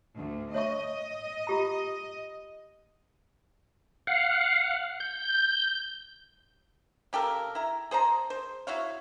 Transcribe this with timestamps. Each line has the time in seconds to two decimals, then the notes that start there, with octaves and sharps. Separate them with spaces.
0.17 D2
0.54 C#5 D#5 E5 C#6
1.47 F4 G4 A#5
4.07 F5 F#5
5.00 G6
7.13 C#3 G4 A4 A#4
7.55 E4 A#5
7.91 G#4 C5 A5 A#5
8.30 C5
8.67 E4 F#4 C#5 F5